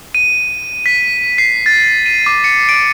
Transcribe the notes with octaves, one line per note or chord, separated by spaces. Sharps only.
D#7
B6
C7
A6
D#7
D6
C#7
D7